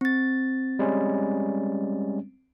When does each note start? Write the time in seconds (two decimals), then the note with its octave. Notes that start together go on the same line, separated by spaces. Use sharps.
0.01 C4 A6
0.79 G3 G#3 C#4